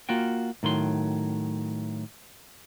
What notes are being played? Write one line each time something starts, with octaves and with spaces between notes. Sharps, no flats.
A#3 F4 F#4 G5
A2 D#3 F#3 C6